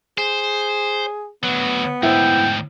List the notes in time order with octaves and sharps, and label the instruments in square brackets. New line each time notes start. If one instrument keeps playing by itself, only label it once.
[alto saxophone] G#4 [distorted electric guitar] C5
[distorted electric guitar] D2 F#3 [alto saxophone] B3
[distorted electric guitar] D2 G#2 [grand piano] E4 C5 [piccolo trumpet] G5